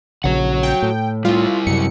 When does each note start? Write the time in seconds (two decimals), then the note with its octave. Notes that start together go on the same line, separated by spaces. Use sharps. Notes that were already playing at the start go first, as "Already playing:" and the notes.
0.24 A#1 C#3 F#4 C#5 F#5
0.63 G5
0.82 A2
1.25 G3 E4 F4
1.67 F#2 C3 C#7